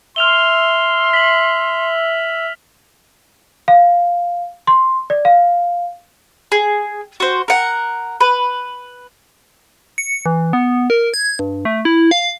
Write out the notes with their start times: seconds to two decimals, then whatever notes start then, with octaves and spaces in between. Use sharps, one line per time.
0.16 E5 C6 F6 F7 G7
1.13 B6 F#7
3.68 F5
4.67 C6
5.10 D5
5.25 F5
6.52 G#4
7.20 F#4 C5
7.48 A#4 F#5
8.20 B4
9.98 C#7
10.26 E3
10.53 B3
10.90 A#4
11.14 G#6
11.39 G2
11.65 A3
11.85 E4
12.11 F5